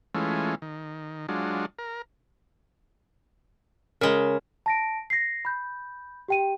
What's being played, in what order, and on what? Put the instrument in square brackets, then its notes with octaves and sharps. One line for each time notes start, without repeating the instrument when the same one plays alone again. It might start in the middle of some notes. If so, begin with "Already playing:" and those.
[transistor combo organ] E3 G#3 A3 C#4 F4
D#3
F#3 G#3 D4 F4
A#4
[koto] C#3 G#3 [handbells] A#4
[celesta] A5 A#6 D7
A#6 C7
B5 G6
G4 G5 D#7